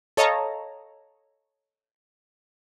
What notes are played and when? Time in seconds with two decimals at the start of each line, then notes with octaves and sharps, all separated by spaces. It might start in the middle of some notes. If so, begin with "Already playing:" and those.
0.17 A4 C#5 D#5 F5 A5 A#5